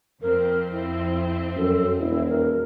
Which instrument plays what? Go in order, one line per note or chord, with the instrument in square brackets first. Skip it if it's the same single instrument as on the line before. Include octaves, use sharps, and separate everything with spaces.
[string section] F2 C4 [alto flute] A#4
[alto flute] E4
[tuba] F#2 [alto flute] A4
[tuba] E1 [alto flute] E4
[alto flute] A#4